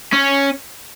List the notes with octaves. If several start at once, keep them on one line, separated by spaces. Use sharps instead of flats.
C#4